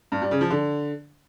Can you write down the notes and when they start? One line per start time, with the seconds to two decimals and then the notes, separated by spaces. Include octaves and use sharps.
0.12 G2
0.22 G3
0.31 C#3
0.41 F3
0.51 D3